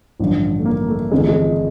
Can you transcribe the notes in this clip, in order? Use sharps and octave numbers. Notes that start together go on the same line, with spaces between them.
A1 G2 D3 F3
A3
A#3
A3
G1 F2 C#3 E3 G#3
A3
G#3